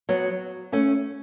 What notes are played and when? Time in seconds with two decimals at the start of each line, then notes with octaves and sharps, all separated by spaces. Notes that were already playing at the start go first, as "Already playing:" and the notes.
0.09 F#3 B3
0.72 A3 C#4